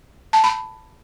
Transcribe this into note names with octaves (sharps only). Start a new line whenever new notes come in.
A5
B5